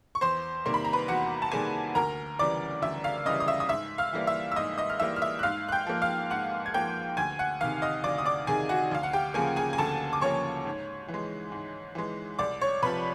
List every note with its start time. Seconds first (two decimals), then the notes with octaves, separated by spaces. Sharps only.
0.15 C#6
0.21 E2 C5 C6
0.66 C3 D#3 G3 A#3 C6
0.74 B5
0.84 A#5
0.93 B4 B5
1.08 E2 F#4 F#5
1.42 A5
1.52 C3 D#3 G3 A#3 G#4 G#5
1.95 D2 A#4 A#5
2.39 C#3 E3 G3 D5 D6
2.82 D2 E5 E6
3.04 F5 F6
3.25 C#3 E3 G3 D#5 D#6
3.40 D#6
3.48 E5 E6
3.60 D#6
3.69 G#2 E5 E6
3.98 F5 F6
4.13 E3 G3 A#3
4.27 E5 E6
4.52 E6
4.56 G#2 D#5 D#6
4.78 D#5 D#6
4.90 F6
5.00 E3 G3 A#3 E5 E6
5.16 F6
5.22 E5 E6
5.39 F#6
5.43 G#2 F5 F6
5.69 F#6
5.72 G5 G6
5.87 F3 A#3
6.02 F5 F6
6.30 G#2 F#5 F#6
6.66 G#6
6.74 F3 A#3 G5 G6
7.17 D2 G#5 G#6
7.39 F#5 F#6
7.61 C3 D#3 F5 F6
7.82 D#5 D#6
8.04 D2 D5 D6
8.18 D#6
8.26 D5 D6
8.47 C3 D#3 G#4 G#5
8.69 F#4 F#5
8.91 D2 F5
9.03 F#5
9.13 G4 G5
9.34 C#3 F3 A#3 G#4 G#5
9.56 G#4 G#5
9.73 G#5
9.78 D2 A4 A5
10.13 D6
10.21 C#3 F3 A#3 C#5 C#6
10.66 G#2
11.08 E3
11.14 G#3
11.52 G#2
11.95 E3 G#3
12.39 C2 D5 D6
12.61 C#5 C#6
12.82 C3 F3 B4 B5